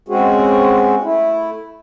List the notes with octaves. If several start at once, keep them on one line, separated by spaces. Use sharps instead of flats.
G#3 C4 C#4 F#4 G#4
A3 E4